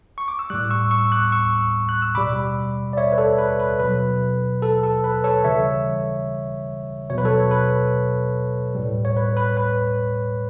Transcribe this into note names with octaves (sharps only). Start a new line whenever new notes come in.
C#6
D6
E6
A2 G3 D6 F#6
C#6 E6
C#6 E6
D6 F#6
C#6 E6
F#6
E6
B2 G3 B5 D6
D5
C#5 E5
B4
A4 C#5
B4
B4
B2 F#3 B4
A4
A4
B4
A4 C#5
C#3 E3 G3 C#5 E5
B2 F#3 B4 C#5
A4 C#5
C#5
B4
A2 G3
C#5
B4
B4
B4